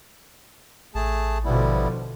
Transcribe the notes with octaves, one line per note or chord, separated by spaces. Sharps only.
A1 A3 G#4 A5
B2 D3 F3 G3 B3 E4